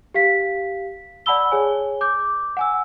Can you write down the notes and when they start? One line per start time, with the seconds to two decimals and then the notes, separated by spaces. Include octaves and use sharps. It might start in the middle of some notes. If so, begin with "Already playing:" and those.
0.14 G4 F5 B6
1.26 D5 F#5 A5 B5 E6 G7
1.52 G#4 C#5 G#5
2.01 D6 G6
2.57 F#5 G#5 E6